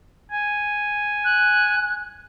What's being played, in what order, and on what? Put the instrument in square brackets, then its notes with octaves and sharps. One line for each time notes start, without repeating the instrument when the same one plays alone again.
[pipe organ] G#5
[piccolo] F#6